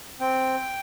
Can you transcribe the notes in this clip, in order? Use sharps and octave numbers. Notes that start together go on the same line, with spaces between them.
C4 G5